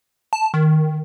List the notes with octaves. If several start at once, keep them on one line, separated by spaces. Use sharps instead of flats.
A5
D#3